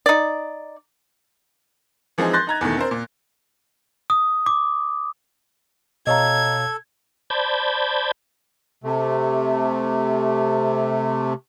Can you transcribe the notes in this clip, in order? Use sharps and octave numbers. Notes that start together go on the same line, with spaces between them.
D#4 D5
E3 F3 G#3 C4 D#4 G#4
C6 F#6 G6 A6 A#6
D#4 A#5 G#6
E2 B2 D#3 A3
C4 A#4 C5
A#2
D#6
D6
B2 A4 C#5 D#5 F5 A#5 G#6
C5 D5 A5 B5 G6 G#6
C3 A3